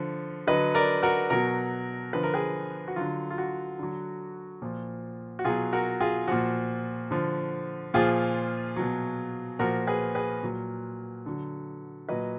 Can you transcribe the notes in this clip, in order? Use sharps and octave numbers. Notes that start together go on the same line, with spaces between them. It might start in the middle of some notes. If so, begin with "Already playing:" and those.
Already playing: D3 F3
D3 F#3 B4 D#5
A#4 D5
F#4 A#4
B2 F#3 F#4 A#4
D3 F3 B4
A#4
G#4 B4
F#4
D3 F#3 F4
F4
F#4
D3 F#3
A#2 F3
F#4
B2 F#3 F4 G#4
F#4 A#4
F4 G#4
A#2 F3 F#4
D3 F3
A#2 F3 F4 G#4
B2 F#3
A#2 F3 F#4 A#4
G#4 B4
G#4 B4
A#2 F#3
D3 F#3
A#2 F#3 B4 D#5